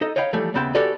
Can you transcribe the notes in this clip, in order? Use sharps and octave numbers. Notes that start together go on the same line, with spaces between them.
D#4 A4 D#5
C#5 D#5 F5 G5 B5
E3 F3 G3 A3
D#2 C#3 B3 E5 G5 C6
F#4 G4 A4 B4 D5 G#5